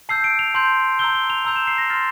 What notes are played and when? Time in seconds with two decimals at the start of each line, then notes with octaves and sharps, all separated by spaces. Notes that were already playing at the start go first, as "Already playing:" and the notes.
0.09 A5 E6 G6 C7
0.24 D7
0.39 F7
0.54 A5 C6 G6
0.99 A#5 E6 G6 G7
1.15 G7
1.30 F7
1.45 A#5 E6 G6 F7
1.56 E7
1.67 C7
1.78 A#6
1.90 C6 F6 A6